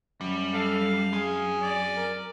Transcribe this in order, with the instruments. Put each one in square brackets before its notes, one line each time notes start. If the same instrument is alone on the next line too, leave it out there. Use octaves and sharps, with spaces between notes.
[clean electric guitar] F#2 [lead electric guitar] G3
[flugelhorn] A4 [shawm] F5
[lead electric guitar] C4 G#5 [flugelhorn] G#4
[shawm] D5
[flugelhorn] A#4